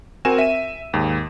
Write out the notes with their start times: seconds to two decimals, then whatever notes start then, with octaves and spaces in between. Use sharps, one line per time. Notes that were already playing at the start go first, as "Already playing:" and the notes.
0.25 C4 F#4 A#4 G#5 E7
0.38 E5 D#7
0.93 D#2 G#2